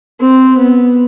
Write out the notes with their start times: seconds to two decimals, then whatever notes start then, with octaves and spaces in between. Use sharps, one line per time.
0.20 C4
0.58 B3